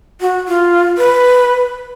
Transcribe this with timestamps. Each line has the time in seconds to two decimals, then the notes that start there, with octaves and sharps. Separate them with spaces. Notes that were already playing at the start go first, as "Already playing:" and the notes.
0.21 F#4
0.48 F4
0.98 B4